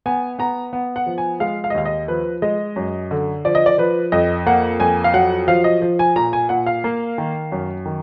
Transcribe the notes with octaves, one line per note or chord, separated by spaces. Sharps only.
B3 G#5
B3 A#5
B3
F#5
F3
G#5
G#3 F5
F5
D#5
D#2 F5
D#5
F3 B4
G#3 D#5
F#2
D3
F3 D5
D#5
D5
F3 B4
F2 D#5
A#3 F#5
F2 G#5
F5
F#3 F#5
F3 F5
D#5
F3
G#5
A#2 A#5
G#5
A#2 F#5
F5
A#3
D#3
F#2
D#3